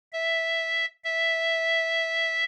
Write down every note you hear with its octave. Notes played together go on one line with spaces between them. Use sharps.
E5
E5